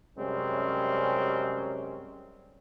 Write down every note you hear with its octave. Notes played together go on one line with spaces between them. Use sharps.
F#2 C3 G3 G#3 C4 C#4